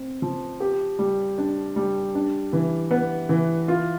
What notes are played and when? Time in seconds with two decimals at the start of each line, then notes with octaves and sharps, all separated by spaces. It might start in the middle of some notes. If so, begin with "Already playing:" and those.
Already playing: C4
0.22 F3
0.60 G4
0.99 G3
1.38 D4
1.76 G3
2.15 D4
2.53 E3
2.91 B3
3.29 E3
3.68 F4